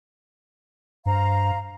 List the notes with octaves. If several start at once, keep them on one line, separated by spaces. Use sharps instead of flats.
G2 C5 F5 A#5